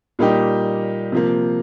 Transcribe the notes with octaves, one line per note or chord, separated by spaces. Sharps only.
A#2 G3 A#3 D#4 G4
C3 F3 A#3